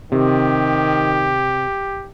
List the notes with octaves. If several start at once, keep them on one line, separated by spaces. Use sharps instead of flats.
C3 D#3 G4